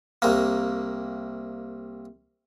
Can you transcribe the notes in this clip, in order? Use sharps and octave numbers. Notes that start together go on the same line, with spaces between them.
C2 A#3